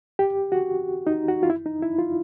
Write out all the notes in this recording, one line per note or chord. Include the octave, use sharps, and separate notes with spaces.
G4
F#4
D#4
F#4
F4
E4
D#4
E4
F4